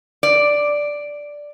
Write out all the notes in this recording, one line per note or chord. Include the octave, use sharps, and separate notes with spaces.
D5